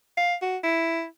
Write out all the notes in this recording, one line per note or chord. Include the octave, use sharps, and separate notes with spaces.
F5
F#4
E4